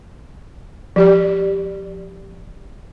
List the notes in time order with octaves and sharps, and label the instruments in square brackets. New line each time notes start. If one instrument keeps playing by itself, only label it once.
[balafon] F3 G4 D5